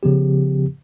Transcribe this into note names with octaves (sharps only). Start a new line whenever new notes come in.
C#3 F3 B3 G4